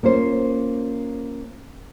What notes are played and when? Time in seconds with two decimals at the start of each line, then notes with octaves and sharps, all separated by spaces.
0.03 A#3 C#4 F4 C5